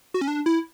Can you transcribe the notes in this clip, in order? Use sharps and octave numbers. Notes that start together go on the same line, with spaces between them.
F#4
C#4
D4
E4